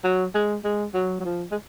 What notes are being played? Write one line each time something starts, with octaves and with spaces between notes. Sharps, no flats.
F#3
G#3
G#3
F#3
F#3
F3
G#3